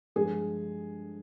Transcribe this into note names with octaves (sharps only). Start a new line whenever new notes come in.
G2 F3 G#3 G#4